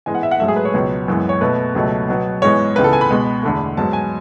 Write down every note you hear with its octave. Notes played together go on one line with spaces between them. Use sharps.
G#2 E3 G#3 B3 G#5
F#5
E5
F#5
G#2 F#3 A3 E5
G#4
B4
C#5
C#2 B2 F#3 B3
F#2 E3 G#3 B3
C#5
B2 A3 B4
C#2 B2 F#3 A3
B2 F#3 B3
G#2 E3 G#3 B3 C#5
C#2 C#3 E3 B3 B4
A4
G#5
B5
B2 G#3 B3
E2 D3 A3
G#2 F#3 B3 A5
G#5